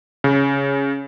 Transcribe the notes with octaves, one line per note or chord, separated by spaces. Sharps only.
C#3